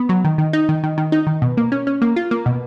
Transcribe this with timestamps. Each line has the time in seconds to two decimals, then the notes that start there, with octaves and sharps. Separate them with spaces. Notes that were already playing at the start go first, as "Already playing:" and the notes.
Already playing: B3
0.09 F#3
0.25 D#3
0.38 D#3
0.53 D#4
0.69 D#3
0.84 D#3
0.98 D#3
1.12 D#4
1.27 D#3
1.42 B2
1.57 A#3
1.72 C#4
1.87 C#4
2.02 A#3
2.16 F4
2.31 A#3
2.46 B2